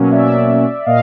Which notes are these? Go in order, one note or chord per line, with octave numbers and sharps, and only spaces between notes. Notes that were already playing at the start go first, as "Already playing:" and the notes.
Already playing: B2 F#3 A#3 C#4
D5 E5
A#2 D#5 F5